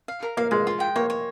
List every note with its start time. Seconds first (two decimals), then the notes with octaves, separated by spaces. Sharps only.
0.08 F5
0.23 A#4
0.37 A#3 F5
0.51 G#3 F5
0.67 F4
0.80 G5
0.96 A#3 C#5
1.10 C#5